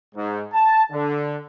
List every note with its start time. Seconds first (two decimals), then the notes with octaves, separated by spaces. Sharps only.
0.15 G#2
0.53 A5
0.92 D3